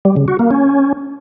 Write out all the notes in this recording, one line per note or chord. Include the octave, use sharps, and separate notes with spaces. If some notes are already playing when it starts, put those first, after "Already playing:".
G3
C#3
F#4
A#3
C#4